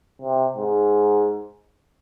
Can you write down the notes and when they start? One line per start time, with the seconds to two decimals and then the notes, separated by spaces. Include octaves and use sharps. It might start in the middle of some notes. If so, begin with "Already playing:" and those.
0.22 C3
0.57 G#2